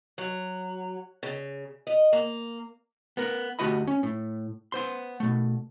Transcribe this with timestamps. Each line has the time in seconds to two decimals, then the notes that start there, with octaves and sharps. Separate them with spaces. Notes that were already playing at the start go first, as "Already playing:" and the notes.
0.18 F#3
1.23 C#3
1.87 D#5
2.13 A#3
3.17 B3 A#4
3.59 D2 A3 F#4 G4 D#5 B5
3.87 C#4
4.03 A2
4.72 B3 C5 C6
5.20 B2 A3